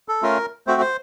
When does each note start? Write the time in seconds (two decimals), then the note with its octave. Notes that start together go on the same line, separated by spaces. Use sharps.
0.08 A4
0.23 A3 C#4 F4 A#4
0.67 A3 C4 F#4 C5
0.81 C5